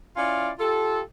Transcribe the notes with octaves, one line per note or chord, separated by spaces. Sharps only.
C#4 E4 F4 D5 F5
F4 G4 A4